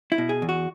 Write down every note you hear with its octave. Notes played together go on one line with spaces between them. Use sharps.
E4
B2
G#4
E2
F#4